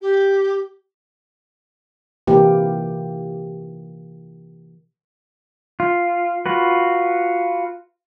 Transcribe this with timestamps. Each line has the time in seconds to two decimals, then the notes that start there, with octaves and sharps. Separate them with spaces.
0.01 G4
2.27 C3 E3 A#3 G4
5.80 F4
6.46 F4 F#4 B4